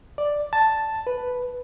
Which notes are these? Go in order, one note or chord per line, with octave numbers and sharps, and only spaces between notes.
D5
A5
B4